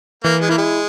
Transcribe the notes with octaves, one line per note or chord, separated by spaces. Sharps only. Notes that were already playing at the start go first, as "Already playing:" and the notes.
E3 A#3
G#3
A#3 E4
G#3